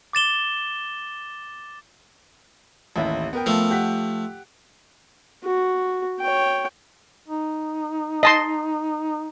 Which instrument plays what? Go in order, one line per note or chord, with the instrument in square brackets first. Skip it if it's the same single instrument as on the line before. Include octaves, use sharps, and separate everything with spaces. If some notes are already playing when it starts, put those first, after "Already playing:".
[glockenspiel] D6 A6 E7 G7
[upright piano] A1 D#2 E4
B3 A#4 G5
[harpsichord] F3 A3
[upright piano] G4 F#5 B6
[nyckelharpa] F#4
C#5 G5
[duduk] D#4
[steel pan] D#5 A5 C6